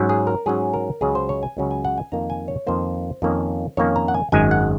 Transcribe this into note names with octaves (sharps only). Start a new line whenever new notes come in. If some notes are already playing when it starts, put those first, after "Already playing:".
Already playing: G#2 F#3 C#4
G#4
A#4
G#2 F#3 C#4 G#4
A#4
C#2 C#3 F#3 C#4 G#4
C5
C#5
G#5
C#2 C#3 F#3 C#4
G#5
F#5
G#5
F2 D#3 A#3 A#5
G#5
C#5
F2 D#3 A#3 C5
F2 D#3 A#3 C#4
F2 D#3 A#3 C#4 C#5
A#5
F#5
G#5
G#1 F#2 D#3 G#3 G#5
F#5